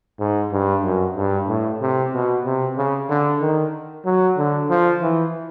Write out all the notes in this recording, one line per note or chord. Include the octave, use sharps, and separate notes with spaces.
G#2
G2
F#2
G2
A2
C3
B2
C3
C#3
D3
D#3
F#3
D3
F3
E3